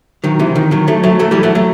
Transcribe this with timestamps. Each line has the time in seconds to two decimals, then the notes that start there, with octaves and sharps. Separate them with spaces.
0.24 D#3 F#3
0.39 C3 E3
0.56 D#3
0.71 D#3 F#3
0.88 F#3 A3
1.03 F#3 A3
1.19 F#3 A3
1.31 E3 G3
1.43 F#3 A3
1.55 F#3 A3